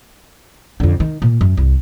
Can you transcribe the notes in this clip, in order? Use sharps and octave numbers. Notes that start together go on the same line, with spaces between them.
F2 D3
D#3
A#2
F#2
C2